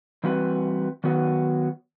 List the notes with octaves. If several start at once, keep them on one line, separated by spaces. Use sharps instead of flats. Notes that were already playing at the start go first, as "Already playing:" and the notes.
E3 G3 C4 F#4 B4
D#3 F#3 B3 F#4 B4